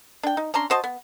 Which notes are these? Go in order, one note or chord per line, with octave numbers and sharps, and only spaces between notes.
D4 G5
D#4
C#4 D4 A#5 C6
F#4 C5 D#5 A5
B3